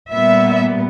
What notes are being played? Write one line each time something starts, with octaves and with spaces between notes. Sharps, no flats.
A#2 G3 B3 E5